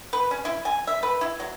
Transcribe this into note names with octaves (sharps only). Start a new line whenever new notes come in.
B4
C#4
E4
G#5
E5
B4
E4
F#3